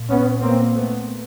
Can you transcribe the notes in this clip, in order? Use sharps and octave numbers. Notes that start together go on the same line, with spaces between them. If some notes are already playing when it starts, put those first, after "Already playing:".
Already playing: A#2
B3 C#4
A#3 C4
A3 B3